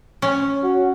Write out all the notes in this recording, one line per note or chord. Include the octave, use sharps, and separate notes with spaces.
C#4
F#4